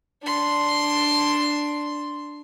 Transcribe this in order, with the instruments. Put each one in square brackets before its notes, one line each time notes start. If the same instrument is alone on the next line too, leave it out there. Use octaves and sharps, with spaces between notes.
[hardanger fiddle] D4 C6